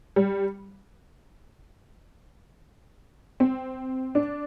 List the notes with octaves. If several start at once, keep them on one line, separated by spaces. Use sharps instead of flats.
G3
C4
D4